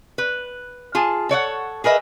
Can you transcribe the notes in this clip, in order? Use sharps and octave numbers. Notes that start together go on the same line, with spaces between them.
B4
F4 G#4 A5
A4 C#5 D5 F#5
G#4 A#4 B4 D#5 E5